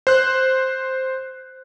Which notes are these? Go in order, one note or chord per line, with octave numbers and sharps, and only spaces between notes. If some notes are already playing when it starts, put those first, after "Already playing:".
C5 F#6